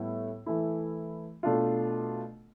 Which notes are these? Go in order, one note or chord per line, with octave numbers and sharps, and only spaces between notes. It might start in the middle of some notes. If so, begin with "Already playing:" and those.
Already playing: A2 G3 B3 E4
E3 A3 E4
B2 A3 D4 F4